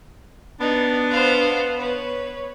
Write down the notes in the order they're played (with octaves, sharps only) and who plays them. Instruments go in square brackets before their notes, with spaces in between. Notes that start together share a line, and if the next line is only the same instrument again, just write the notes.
[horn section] B3 [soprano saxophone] D4 [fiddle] D#4
[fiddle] C5 F5
[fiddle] B4 [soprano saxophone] C#5